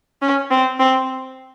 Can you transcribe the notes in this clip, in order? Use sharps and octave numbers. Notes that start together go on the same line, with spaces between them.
C#4
C4
C4